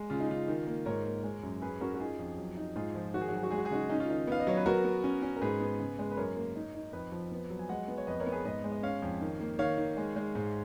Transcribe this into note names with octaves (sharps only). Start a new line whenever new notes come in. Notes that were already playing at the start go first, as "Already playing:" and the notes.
Already playing: G#3
C#3 F4
D#4
C#3 F4
D#3
A#3
G#2 A#4 C#5
A#3
G#3
F#2
C#4 G#4 B4
C#4 F#4 A#4
F#4
D#4 F4 G#4
F2
F#3
D#4
G#2 F4 G#4
F3
D#3 F#4
G#4
F#4
F#3 G#4
F#4
G#3 G#4
F#4
G#4
C#3 D#4 F#4
C#4 D#4
F4
D#3 D#4
B3 F5
D#5
F#3 C#5
B4
B3 F#4 A#4
B3
C#4
C#4
A#4
G#2 G#4 B4
B3
C#3
G#3
B4
F#2 A#4 C#5
A#3
D#4
D#4
F2 B4 D#5
F3
B3
F#3
G#5
G#3 D#5 F#5
B3
C#5
F2 B4 D#5
A#4 C#5
B3
G#4 B4
G#2 B4 D#5
G#3
D#5
C#4 C#5 F5
F2
D#3
A#3
D#3 C#5 F5
D#3
G#3
G#3
G#2